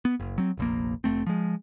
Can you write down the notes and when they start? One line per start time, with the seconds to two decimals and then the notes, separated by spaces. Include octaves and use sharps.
0.05 B3
0.20 F#1
0.38 F#3 C4
0.57 F1 A#1 A#3
1.04 F1 A3 C4
1.27 F3 G#3